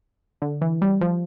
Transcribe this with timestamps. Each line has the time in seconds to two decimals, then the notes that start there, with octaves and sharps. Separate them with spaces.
0.42 D3
0.61 E3
0.82 G3
1.01 F3